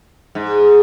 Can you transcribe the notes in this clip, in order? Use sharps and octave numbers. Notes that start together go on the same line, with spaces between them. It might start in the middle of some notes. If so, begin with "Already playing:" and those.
G#2